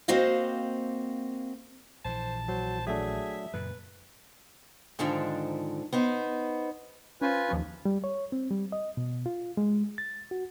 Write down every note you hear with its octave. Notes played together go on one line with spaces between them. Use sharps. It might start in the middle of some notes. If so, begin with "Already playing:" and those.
A#3 C4 F#4 C5 D#5 F5
A#1 E3 C5 A5
F#3 C5
F#3 A3 D4 G#4 E5
F#2 A#2 C#3 B4
G#2 D3 D#3 F3 D4
B3 D#4 C5
C#4 F4 B4 C5 G#5
D#2 F3 C#4
G3
C#5
C4
G3
D#5
B2
F4
G#3
A6
F#4